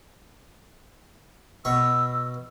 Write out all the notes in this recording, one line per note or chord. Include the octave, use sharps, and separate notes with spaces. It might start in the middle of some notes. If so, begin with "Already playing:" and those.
B2 C#6 E6